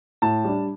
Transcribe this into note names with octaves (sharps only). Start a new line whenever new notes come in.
A2 A5
G3 D4